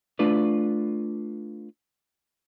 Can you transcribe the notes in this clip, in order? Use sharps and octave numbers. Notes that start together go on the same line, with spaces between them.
A3 D4 F4 B4 D5